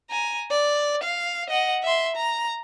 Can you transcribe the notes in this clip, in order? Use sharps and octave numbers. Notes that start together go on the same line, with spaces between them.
G#5 A#5
D5
F5
D#5 F#5
E5 C6
A#5